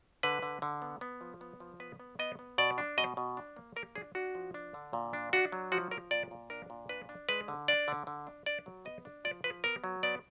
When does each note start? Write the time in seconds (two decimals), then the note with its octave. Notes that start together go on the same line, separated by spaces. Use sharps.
0.23 D3 B4
0.42 D3
0.62 D3
0.82 B3
1.01 B3
1.21 F3
1.41 B3
1.60 F3
1.80 B3 B4
2.00 B3
2.19 B3 D#5
2.39 B3
2.58 B2 D5
2.78 D4
2.98 B2 D#5
3.17 B2
3.37 D4
3.56 A#3
3.76 A#3 A#4
3.95 D4 G#4
4.15 D4 F#4
4.35 F3
4.54 D4
4.74 D3
4.93 A#2
5.13 D4
5.33 D4 F#4
5.52 F#3
5.72 F3 F#4
5.91 F3 A#4
6.11 A#2 D5
6.31 A#2
6.50 D4 A#4
6.70 A#2
6.89 D4 B4
7.09 D4
7.29 G#3 B4
7.48 D3
7.68 D4 D5
7.88 D3
8.07 D3
8.27 D4
8.46 D4 D5
8.66 F#3
8.85 B3 D#5
9.05 D4
9.25 F3 D5
9.44 F3 B4
9.64 B3 A#4
9.84 F#3
10.03 B3 D5